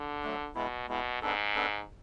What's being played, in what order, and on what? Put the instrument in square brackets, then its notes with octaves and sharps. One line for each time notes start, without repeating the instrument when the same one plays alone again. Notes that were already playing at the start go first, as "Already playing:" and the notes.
Already playing: [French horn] D3
[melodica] F#3 A3 D4
[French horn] B2 [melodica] G#3 B3 E4
[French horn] B2 [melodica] G#3 B3 E4
[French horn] G#2 [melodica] B3 D4 A4
[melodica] B3 D4 A4